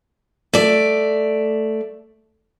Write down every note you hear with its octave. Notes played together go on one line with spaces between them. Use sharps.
A3 D5